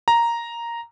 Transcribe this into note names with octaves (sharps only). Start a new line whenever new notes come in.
A#5